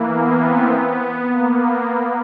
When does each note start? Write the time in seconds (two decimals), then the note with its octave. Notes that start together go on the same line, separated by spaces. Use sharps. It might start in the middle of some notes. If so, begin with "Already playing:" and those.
Already playing: E3 A#3
0.12 B3
0.42 C4
0.73 B3
1.33 A#3